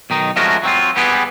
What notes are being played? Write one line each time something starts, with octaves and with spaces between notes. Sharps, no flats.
B1 D#3 D#4
F3 G#3 A3 C#4 F#4 A#4
F#3 C4 F4
G3 B3 G4 G#4 A#4 B4